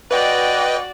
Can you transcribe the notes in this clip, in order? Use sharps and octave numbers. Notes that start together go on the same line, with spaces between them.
F#4 B4 D5 D#5 G5